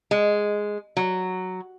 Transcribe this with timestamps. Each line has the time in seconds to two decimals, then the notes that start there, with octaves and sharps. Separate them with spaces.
0.11 G#3
0.97 F#3